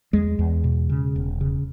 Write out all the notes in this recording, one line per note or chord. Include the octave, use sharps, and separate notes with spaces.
E2 G#3
E2
B2
C#3
E1
C#3